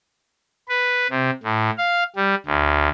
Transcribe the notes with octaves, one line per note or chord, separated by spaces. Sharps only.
B4
C3
A2
F5
G3
D2